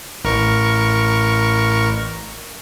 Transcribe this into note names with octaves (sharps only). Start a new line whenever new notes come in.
A1 A#4 C#6